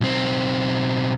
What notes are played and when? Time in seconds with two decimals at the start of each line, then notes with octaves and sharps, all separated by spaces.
0.01 B1 C4